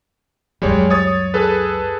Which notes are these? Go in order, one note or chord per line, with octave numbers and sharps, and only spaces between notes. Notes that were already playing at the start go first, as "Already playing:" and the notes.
C#2 F#2 G3 G#3 C#5
C#5 D#6 A6
G#4 A4 B4